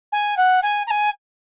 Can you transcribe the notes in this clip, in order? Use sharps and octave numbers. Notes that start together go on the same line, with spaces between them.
G#5
F#5
G#5
A#5
G#5